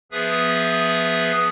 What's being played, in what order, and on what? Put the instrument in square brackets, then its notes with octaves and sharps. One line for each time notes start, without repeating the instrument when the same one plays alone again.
[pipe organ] F3 B3 G#4 B4 E5 D#6